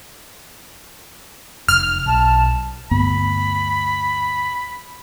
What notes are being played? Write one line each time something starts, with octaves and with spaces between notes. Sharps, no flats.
F1 F6
B1 A5
D2 G2 B3 B5